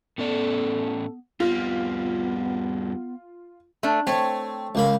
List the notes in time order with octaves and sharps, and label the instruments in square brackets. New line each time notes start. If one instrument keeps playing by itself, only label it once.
[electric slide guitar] A2 C#4 D5 [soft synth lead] B3 [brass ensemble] A4
[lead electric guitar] F2 G3 [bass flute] B3 [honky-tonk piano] F4
[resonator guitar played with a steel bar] A3 D4
[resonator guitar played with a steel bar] A3 C#5 [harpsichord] C4
[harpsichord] C#2 A#3 B5